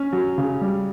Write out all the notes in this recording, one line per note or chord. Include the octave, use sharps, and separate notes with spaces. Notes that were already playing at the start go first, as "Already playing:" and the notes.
Already playing: C#4
F#3
C#3
G3